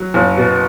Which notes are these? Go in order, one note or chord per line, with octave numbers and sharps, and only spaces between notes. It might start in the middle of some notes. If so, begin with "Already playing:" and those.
Already playing: F#3
F#1
B2